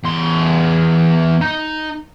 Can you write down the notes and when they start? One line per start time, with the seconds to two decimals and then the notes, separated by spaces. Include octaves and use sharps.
0.04 E2 C6
1.41 D#4